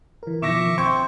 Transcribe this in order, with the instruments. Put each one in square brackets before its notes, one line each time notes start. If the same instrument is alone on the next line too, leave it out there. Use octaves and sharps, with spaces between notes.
[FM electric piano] E3 A#4
[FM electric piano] B2 D#3 F3 [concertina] E5 C#6 D6 [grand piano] A#6 E7
[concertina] C4 C5 [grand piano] C#6 [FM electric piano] G#6